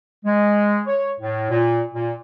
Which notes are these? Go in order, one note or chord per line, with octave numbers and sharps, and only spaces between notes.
G#3
C#5
A2
A#2
A#2